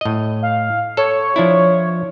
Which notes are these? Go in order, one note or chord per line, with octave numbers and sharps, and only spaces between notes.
A2 D#5
F5
A4 C#5
F3 D4 E4